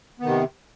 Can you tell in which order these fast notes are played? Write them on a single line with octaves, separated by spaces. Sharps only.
B3 D#3 C3